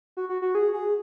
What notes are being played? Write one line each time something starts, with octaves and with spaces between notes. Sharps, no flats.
F#4
F#4
F#4
G#4
G#4